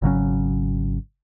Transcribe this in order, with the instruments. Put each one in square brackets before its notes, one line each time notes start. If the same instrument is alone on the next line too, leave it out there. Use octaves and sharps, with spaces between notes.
[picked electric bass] G#1 C#3 F#3 C#4